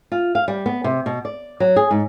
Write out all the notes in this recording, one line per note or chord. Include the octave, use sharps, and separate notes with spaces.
F4
F5
G3
B3
C3
B2
D5
F#3
G#4
G#2